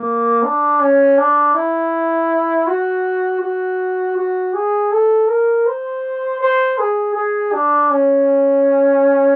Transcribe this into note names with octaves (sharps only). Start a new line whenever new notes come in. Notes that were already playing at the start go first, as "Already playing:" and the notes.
Already playing: A#3
D4
C#4
D4
E4
F#4
F#4
F#4
G#4
A4
A#4
C5
C5
G#4
G#4
D4
C#4